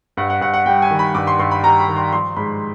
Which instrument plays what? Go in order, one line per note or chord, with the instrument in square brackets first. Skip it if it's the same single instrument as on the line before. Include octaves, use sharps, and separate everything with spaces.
[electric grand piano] G2 F#5
F#5
G2 F#5
F#5
G3 G5
G#5
D#3
B5
G2 D6
C6
G2 C6
B5
G3 A#5
B5
D#3
C6
F3 C6
G#2 B5